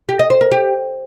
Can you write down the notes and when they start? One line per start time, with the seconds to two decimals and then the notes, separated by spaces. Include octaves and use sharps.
0.09 G4
0.19 D#5
0.30 C5
0.41 A#4
0.52 G4